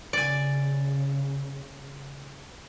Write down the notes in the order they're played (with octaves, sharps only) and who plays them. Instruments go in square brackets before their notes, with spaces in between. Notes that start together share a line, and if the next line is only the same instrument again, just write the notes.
[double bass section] C#3 [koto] D5 G#5